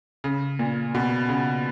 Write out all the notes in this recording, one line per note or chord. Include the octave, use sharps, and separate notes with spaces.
C#3
A#2
B2
C#3